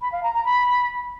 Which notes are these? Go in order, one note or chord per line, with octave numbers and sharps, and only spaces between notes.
B5
F5
A#5
A#5
B5